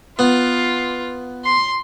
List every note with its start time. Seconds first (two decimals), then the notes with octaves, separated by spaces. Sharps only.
0.19 B3 F4
1.45 C6